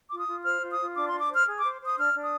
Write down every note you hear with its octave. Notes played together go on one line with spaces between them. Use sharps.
F4 D6
D#6
F4
C5 F6
F4
D#6
F4
D4 D6
C6
D4
D6
C5
F6
G#4
D6
C5
C5 D#6
D4 F6
D4
D#6